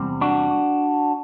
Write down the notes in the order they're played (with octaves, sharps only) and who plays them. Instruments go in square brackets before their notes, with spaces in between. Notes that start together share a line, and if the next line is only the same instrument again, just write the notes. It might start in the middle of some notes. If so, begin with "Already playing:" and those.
Already playing: [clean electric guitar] E2 C3 G3 C4
D4 F#4